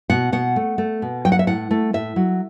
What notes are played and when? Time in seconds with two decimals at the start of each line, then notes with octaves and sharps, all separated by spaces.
0.10 B2 F#5
0.32 B2 F#5
0.56 A3
0.78 A3
1.02 B2
1.25 F#3 G5
1.32 F#5
1.39 E5
1.47 A2 F#5
1.71 A3
1.93 A2 E5
2.16 F#3